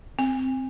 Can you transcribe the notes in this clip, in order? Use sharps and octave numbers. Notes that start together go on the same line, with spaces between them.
C4